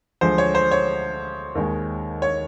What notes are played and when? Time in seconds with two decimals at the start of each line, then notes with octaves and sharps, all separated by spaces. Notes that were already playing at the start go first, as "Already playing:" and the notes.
0.21 D2 D3 F3 G#3 C5
0.38 C#5
0.55 C5
0.71 C#5
1.55 D#2 D#3 G#3
2.22 C#5